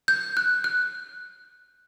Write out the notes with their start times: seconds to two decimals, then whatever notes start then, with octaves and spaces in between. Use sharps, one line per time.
0.08 G6
0.37 F#6
0.64 F#6